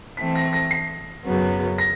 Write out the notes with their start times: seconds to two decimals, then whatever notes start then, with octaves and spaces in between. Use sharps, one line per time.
0.17 E3 A3 C4 B6
0.35 A#6
0.53 A#6
0.71 C7
1.25 F#2 C#3 F#3 B3
1.78 A#6